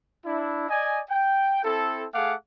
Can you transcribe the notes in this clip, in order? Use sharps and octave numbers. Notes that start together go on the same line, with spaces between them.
D4 E4
D5 D#5 G#5
G5
C4 E4 A4
A3 G#4 F5 F#5 D6